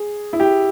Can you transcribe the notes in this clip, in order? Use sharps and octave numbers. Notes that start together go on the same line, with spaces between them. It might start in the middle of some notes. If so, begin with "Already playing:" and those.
Already playing: G#4
E4
G4